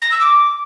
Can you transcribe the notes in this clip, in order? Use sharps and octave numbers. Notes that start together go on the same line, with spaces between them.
A#6
E6
D6